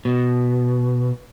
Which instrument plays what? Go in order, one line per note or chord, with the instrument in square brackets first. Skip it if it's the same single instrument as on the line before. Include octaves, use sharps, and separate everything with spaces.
[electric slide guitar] B2